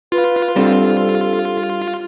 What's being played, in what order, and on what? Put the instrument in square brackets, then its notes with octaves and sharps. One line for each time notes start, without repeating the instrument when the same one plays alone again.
[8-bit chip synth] F4 [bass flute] B4
[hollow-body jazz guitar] G3 C4 D4 [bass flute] A4